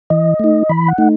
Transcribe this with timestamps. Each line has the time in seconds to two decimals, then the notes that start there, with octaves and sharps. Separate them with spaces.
0.10 E3 D#5
0.40 A3 D#4
0.69 E3 B5
0.88 F#5
0.98 A3 D#4